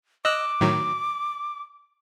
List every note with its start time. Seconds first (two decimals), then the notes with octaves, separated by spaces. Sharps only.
0.25 D#5 D6 E6 F#6
0.61 A2 D#3 F#3